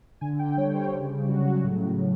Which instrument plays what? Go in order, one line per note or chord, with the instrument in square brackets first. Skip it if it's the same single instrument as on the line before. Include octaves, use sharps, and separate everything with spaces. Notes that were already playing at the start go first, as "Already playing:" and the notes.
[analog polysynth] D3 G#5
G5
G3 C#5
C5
C#3
F#3 F#4
A2
A2